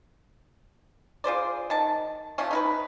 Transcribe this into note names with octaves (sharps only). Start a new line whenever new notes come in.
F4 G#4 C5 D5
D#3 A5
F3 A3 C#4
D#4 A#4 B4